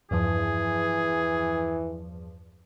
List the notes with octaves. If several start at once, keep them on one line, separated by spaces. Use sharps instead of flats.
E2 G2 E3 F3 G#4